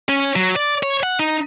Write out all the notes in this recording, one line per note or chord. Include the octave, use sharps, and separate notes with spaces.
C#4
F#3
D5
C#5
F#5
D#4